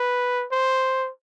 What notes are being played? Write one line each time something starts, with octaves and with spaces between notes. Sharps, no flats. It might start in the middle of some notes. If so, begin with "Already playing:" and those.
Already playing: B4
C5